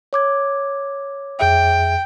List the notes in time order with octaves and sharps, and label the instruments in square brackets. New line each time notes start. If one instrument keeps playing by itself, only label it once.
[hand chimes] C#5 D6 G#6
[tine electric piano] F2 G#4 E5 [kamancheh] G5